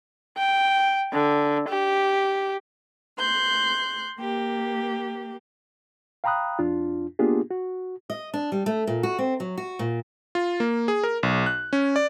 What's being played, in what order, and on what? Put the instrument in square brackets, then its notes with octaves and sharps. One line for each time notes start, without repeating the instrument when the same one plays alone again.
[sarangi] G5
D3
G4
[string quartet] C6 F#6 G6
A#3 G4
[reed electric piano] F5 G5 A#5 B5 D#6 F#6
F2 D4 F4
A#3 B3 D4 F4 G4 G#4
F#4
[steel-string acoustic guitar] D#5
D4
G3
A3
A#2
F#4
C4
F#3
F#4
A#2
[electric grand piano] F4
A#3
G#4
A#4
B1
F#6
C#4
D5